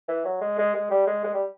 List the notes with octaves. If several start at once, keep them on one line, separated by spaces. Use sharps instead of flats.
E3
F#3
G#3
G#3
G#3
G3
G#3
G#3
G3